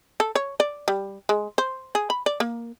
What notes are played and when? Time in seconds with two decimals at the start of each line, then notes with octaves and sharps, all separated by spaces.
0.20 A4
0.35 C#5
0.60 D5
0.88 G3
1.29 G#3
1.58 C5
1.95 G#4
2.10 B5
2.26 D5
2.40 A#3